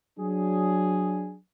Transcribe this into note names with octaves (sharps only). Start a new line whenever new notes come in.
F#3 D4 G#4